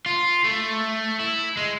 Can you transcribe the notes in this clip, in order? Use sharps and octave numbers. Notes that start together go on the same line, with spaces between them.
F4
A3
E4
G#3